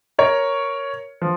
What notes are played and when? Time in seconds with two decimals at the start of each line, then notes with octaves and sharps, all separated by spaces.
0.19 A#4 C#5
1.22 F3